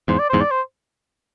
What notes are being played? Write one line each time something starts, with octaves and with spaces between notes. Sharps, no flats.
E2 G#2 C5
D5
E2 G#2 C5
D5
C5